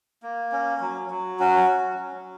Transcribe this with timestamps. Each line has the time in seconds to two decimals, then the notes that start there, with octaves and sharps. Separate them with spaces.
0.23 A#3
0.52 C#4
0.81 F#3
1.10 F#3
1.39 C#4 F#4
1.69 F#3
1.99 F#3